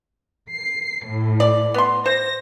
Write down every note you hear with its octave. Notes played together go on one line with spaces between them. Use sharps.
C7
A2
D5
B3 C6
C5 A#6